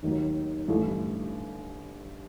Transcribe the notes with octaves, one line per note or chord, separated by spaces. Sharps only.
D#2 D#3 F#3
A1 G2 D3 A3